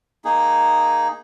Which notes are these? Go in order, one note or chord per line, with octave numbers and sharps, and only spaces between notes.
A#3 D#4 G#4